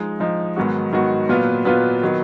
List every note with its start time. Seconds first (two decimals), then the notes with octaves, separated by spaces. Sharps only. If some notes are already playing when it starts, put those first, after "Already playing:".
Already playing: F3 G#3 D#4
0.20 F3 G#3 D#4
0.56 G#2 D#3 F#3 B3 F#4
0.92 G#2 D#3 F#3 B3 F#4
1.29 A#2 F#3 B3 F4 B4
1.65 A#2 F#3 B3 F4 B4
2.03 D#3 F#3 B3